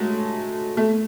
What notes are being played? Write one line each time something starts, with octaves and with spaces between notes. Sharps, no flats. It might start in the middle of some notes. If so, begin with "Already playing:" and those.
Already playing: F#3 G#3 A3
A3